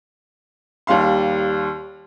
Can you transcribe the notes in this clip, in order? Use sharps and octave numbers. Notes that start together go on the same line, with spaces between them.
D#2 G3 F5 C6